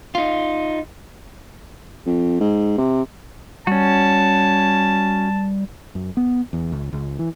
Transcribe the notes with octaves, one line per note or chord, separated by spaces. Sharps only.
D#4 F4
F2
G#2
C3
G3 C#4 F#4 A5
F#2
B3
E2
C#2
C#2
E3